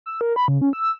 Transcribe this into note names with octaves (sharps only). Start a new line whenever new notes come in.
E6
A#4
B5
C#3
C#4
E6